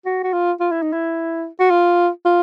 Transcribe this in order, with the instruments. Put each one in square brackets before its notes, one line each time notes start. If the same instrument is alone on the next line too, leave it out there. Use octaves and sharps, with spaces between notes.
[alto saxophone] F#4
F#4
F4
F4
E4
D#4
E4
F#4
F4
F4